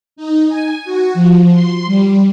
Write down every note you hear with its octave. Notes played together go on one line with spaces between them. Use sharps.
D#4
G#5
F#4
F3
C6
G3